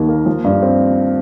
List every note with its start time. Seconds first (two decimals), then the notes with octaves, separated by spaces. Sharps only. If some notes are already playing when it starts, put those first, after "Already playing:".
Already playing: D#2 D#3
0.09 A#3
0.26 F3
0.44 G2
0.63 C4